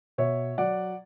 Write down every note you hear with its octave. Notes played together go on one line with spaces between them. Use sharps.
B2 C#5 E5
F#3 D5 F#5